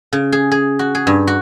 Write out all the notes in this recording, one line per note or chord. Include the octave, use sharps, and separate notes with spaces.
C#3
G#4
G#4
F#4
G#4
G2
F#4